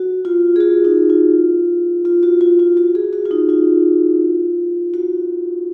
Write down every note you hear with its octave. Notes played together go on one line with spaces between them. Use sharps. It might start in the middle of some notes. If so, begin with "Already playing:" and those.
Already playing: F#4
F4
G#4
F#4
D#4
F4
F4
F#4
F4
F4
F#4
G#4
F#4
F4
D#4
F4
F#4